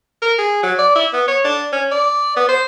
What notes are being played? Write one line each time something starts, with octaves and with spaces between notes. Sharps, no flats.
A#4
G#4
F#3
D5
E4
B3
C#5
D4
C#4
D5
B3
C5